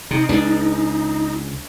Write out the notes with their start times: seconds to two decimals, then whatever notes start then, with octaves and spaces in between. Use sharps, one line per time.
0.11 C3 D#4
0.29 C#2 D4